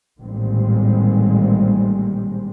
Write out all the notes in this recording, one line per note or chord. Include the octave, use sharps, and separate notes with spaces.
A1 A#2 D#3 G3 G#3 C4